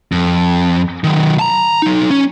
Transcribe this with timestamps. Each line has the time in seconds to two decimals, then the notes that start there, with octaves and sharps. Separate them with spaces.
0.12 F2
1.04 D#3 F#3
1.39 A5 A#5
1.82 F#3 D#4
2.10 C#4